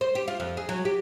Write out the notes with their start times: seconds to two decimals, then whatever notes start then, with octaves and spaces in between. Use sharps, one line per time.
0.01 C5
0.15 G4
0.28 F4
0.40 F2
0.57 G#4
0.69 F#3
0.85 G4